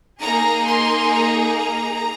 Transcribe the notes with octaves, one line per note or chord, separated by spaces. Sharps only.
A#3 D#4 G#4 A#5
C6
A#5